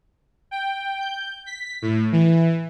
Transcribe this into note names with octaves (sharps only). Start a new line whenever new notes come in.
G5
G6
B6
A2
E3